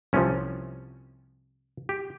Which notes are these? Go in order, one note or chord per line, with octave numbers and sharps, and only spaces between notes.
C2 C3 F3 C#4
G4